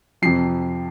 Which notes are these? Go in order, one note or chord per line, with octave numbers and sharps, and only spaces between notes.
F2 C3 F3 C7